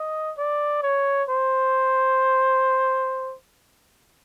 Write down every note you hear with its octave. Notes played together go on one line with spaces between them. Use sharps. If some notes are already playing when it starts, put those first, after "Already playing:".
Already playing: D#5
D5
C#5
C5